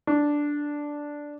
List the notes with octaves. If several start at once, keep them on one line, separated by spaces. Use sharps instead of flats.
D4